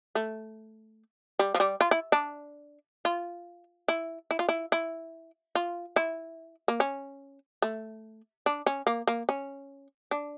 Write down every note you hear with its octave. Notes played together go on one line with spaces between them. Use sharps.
A3
G3
F3
G3
F4
E4
D4
F4
E4
E4
F4
E4
E4
F4
E4
A#3
C#4
A3
D4
C#4
A#3
A#3
C#4
D4